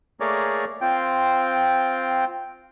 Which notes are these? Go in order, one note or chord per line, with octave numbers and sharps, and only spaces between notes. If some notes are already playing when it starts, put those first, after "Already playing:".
A3 A#3 G#4 A#4 C#5 D5
C4 F4 G5